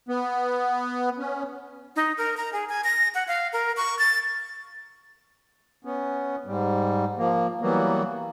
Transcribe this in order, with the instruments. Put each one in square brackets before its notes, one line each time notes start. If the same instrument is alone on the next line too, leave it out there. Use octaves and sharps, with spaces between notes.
[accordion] B3
C#4
[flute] D#4
A#4
A#5
G#4
G#5
A#6
F#5
F5
A#4
C#6
A6
[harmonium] B3 C#4
G#2 G3
F3 A#3
E3 F#3 G3 A#3 B3